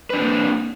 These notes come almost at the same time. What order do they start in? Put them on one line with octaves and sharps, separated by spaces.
B4 D4 C4 A#3